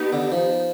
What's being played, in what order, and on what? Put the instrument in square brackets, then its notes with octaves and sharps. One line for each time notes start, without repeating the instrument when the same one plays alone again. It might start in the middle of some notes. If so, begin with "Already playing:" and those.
Already playing: [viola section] B3 D#4 G4
[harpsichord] D3
F3